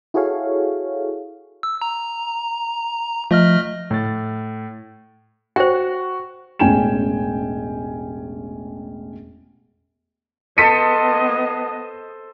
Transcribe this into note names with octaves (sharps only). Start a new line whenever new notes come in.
E4 F#4 G#4 A4 C#5 F5
E6
A#5
F3 A3 D#5 F6
A2 A6
F#4 C5 G5
E1 A1 C#4 G5 G#5 E7
B3 A4 C5 D#5 A5 B6 C#7 D#7